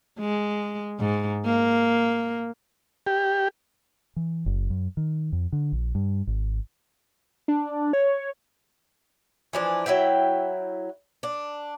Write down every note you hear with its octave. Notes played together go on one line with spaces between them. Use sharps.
G#3
G#2
A#3
G4
E3
F#1
F#2
D#3
F2
D3
A#1
G2
G#1
D4
C#5
E3 F3 D4
F#3 E4 E5 G5
D4